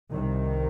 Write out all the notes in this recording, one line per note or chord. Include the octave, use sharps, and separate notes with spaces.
C2 C3 D#3